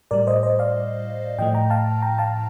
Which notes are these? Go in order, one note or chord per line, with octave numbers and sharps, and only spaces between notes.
A2 G3 A#4 D5
C5 D#5
C5 D#5
D5 F5
A2 F3 A3 D#5 G5
G5 A#5
F5 A5
G5 A#5
F5 A5